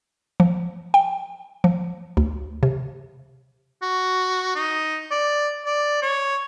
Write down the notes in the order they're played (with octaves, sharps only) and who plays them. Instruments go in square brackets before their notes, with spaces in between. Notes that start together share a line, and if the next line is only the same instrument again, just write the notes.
[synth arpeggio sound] F3
G5
F3
D2
C3
[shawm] F#4
D#4
D5
D5
C#5